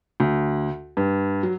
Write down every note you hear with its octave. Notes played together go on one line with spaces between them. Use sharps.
D2
G2
F#3